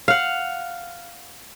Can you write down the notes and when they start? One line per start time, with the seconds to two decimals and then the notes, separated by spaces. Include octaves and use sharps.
0.08 F5 F#5